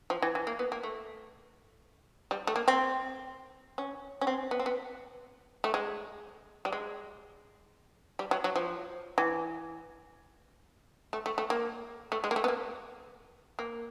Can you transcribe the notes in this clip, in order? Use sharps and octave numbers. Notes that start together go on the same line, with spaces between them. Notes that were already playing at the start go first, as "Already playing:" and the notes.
F3
E3
E3
A#3
B3
A#3
A3
G3
A3
A#3
C4
C#4
C#4
C4
B3
C4
B3
A3
G#3
G3
G#3
G3
F#3
F#3
F3
E3
A3
A3
A3
A#3
A3
G#3
A#3
A3
B3
A#3
A#3